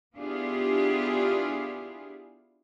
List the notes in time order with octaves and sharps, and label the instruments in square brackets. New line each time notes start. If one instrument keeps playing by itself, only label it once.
[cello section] B3 D4 E4 F4 G4 G#4